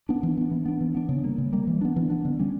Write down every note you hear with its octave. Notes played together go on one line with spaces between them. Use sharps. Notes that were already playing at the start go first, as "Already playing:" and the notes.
B3 D4
E3
B3 D4
E3
B3 D4
E3
B3 D4
C#3
G3 A#3
C#3
G3 A#3
E3
B3 D4
E3
B3 D4
D3
G3 C#4